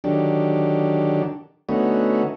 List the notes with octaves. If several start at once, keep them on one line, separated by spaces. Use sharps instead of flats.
D3 D#3 F#3 D4 G4
D3 A3 B3 C#4 D#4 F#4